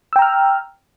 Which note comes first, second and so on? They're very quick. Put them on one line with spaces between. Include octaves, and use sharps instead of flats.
E6 G5 A#5 F6